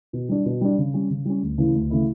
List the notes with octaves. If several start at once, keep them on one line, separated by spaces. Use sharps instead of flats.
B2
G3 D4
B2
G3 D4
C#3
G3 C#4
C#3
G3 C#4
D2
C#3 E3 A3 E4
D2
C#3 E3 A3 E4